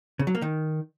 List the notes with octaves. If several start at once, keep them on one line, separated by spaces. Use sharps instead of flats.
C#3
F#3
A#3
D#3